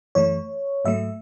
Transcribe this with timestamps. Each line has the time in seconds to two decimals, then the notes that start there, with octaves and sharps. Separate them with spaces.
0.15 F#2 E3 A3 C#5
0.85 G#2 F#3 A3 E5